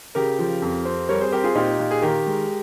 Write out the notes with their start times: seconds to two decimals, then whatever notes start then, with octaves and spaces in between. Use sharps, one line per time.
0.15 C#3 G4 A#4
0.39 F3
0.62 F2
0.85 C4
1.09 G3 A#4 C#5
1.21 G#4 C5
1.32 C4 G4 A#4
1.44 F4 G#4
1.55 A#2 D#4 G4
1.79 A#2
1.91 G#4
2.02 D#3 G4 A#4
2.26 G#3